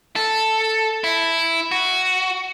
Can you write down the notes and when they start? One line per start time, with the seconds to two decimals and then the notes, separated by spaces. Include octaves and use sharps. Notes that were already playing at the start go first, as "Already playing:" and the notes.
0.16 A4
1.04 E4
1.72 F#4